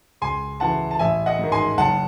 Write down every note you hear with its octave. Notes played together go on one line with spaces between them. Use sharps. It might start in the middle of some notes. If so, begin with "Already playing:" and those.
C#2 G#5 C6
C#3 E3 F#5 A5
A5
A1 E5 G#5
D#5 F#5
G#2 D#3
G#5 C6
F#1 F#5 A5